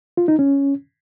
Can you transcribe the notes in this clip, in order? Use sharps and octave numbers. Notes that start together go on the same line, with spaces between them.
F4
D#4
C#4